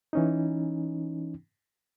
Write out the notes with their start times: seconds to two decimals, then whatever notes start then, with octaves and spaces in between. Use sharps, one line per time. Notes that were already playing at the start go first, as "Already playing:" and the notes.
0.13 E3 C#4 D#4